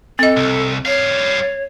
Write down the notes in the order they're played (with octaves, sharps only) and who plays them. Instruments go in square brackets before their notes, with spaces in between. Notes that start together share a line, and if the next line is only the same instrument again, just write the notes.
[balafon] C4 D#5 [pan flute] A4
[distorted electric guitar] C2
[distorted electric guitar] G3 F5 [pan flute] C#5